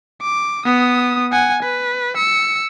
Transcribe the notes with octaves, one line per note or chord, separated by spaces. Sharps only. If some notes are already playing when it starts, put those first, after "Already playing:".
D6
B3 D#6
F#5 G#5
B4
E6 C#7